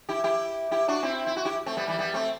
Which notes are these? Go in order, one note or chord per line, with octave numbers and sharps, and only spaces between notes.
E4 G4
E4 G4
E4 G4
D4 F#4
C4 E4
E4
F#4
E4 G4
A3 C4
G3 B3
E3 G3
G3 B3
A3 C4